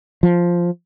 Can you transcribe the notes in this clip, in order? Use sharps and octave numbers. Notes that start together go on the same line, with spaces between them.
F3